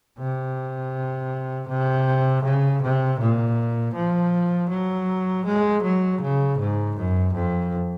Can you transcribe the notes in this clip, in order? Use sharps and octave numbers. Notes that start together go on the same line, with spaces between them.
C3
C3
C#3
C3
A#2
F3
F#3
G#3
F#3
C#3
G#2
F#2
F2